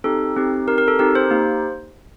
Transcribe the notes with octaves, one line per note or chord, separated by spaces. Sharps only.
C4 D#4 G4 A4
C4 D#4 G4
C4 D#4 G4 A#4
A#4
A4
C4 D#4 G4 A#4
C5
A#3 D#4 G4